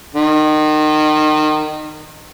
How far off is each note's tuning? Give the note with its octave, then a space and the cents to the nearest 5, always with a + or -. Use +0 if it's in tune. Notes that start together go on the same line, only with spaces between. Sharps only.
D#3 -25